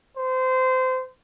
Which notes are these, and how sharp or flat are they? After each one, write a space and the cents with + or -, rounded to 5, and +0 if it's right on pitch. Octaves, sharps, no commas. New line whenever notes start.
C5 -25